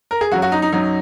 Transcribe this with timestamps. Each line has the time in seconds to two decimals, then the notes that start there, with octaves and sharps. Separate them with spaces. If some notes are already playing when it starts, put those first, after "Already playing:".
0.11 A#4
0.21 G#4
0.32 F#2 F#3 F#4
0.42 F#4
0.52 D#4
0.62 D#4
0.72 F#2 F#3 D#4